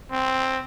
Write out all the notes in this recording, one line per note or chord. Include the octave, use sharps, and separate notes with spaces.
C4